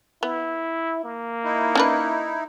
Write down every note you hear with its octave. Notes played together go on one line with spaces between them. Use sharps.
B3 E4
A#3
D#4 E4
C#4 D4 B4